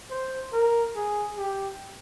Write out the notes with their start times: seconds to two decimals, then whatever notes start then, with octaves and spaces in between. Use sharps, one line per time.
0.11 C5
0.53 A#4
0.95 G#4
1.38 G4